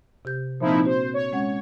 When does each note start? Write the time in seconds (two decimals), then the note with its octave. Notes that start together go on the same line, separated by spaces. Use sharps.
0.25 C3 G4 G6
0.61 A#2 F3 A#3 C4 D#4 E4
0.85 D4 F#4 C5
1.14 C#5
1.32 G#3 C#4 F#5